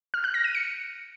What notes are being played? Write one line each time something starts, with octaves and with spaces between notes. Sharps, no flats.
F6
F#6
A#6
D#7
C#7